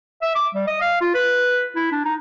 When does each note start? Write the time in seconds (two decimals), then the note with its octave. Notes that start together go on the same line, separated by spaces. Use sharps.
0.22 E5
0.35 D6
0.54 G3
0.67 D#5
0.81 F5
1.01 F4
1.14 B4
1.76 E4
1.92 D4
2.05 D#4